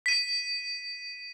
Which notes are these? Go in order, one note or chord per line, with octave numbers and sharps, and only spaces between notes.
B6 D#7